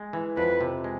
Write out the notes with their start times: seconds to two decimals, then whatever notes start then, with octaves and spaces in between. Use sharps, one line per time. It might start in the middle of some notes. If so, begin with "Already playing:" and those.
Already playing: G#3
0.13 E3
0.36 F2 B4
0.61 C3
0.84 G#3